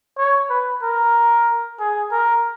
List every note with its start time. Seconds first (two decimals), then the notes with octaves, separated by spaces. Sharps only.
0.18 C#5
0.50 B4
0.83 A#4
1.79 G#4
2.12 A#4